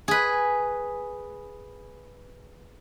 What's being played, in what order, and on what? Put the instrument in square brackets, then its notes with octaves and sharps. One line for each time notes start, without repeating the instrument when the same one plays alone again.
[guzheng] G#4 B4